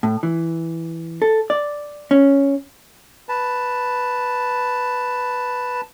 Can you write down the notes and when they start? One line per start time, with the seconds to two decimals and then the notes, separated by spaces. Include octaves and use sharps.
0.03 A2
0.23 E3
1.22 A4
1.50 D5
2.11 C#4
3.29 B4 A5